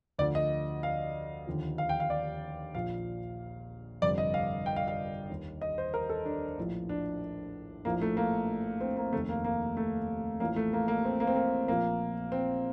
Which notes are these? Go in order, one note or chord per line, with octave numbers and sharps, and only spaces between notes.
D2 D3 F3 D5
D#5
F5
D#2 D3 F3
F5
G5
F5
D5
A#1 A#2 F3 F5
G1 F2 C3 D5
D#5
F5
G5
F5
F5
D#2 D#3
D#5
C5
A#4
A4
D4
A#1 A2 F3
D4
A#1 A2 F3 A#3
A3
A#3
C4
A#3
F1 D#2 D#3 A3
A#3
A#3
A3
A1 A2 F3 A#3
A3
A#3
A#3
C4
A#3
C4
A#3
A#1 A#2 F3 A#3
C4